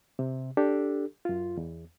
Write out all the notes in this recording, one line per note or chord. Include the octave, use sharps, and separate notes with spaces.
C3
D4 G4 A4
F#2 F4
E2